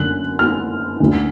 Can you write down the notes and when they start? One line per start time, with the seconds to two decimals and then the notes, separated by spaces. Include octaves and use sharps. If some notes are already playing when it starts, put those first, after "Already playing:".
Already playing: F#2 D3 F#6
0.39 F6
1.00 D2 D3